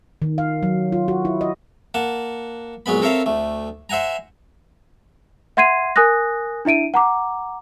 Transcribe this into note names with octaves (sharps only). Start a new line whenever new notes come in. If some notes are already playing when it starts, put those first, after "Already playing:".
D#3
F5
F#3
F4
F#4
E4
D#5
A#3 F#5 A5
A#1 F#3 G#3 B3 B5
C4 A4 A#4 C#5 E5 F5
D2 A3
C5 E5 F#5 G#5 A#5
E5 F#5 C6 G#6 C7 D#7
A#4 G#5 D#6 F#6 A#6
D4 E4 E5 D7 D#7
F#5 A#5 D6